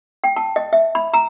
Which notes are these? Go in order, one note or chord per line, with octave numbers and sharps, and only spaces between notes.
G5
A5
D#5
E5
B5
A#5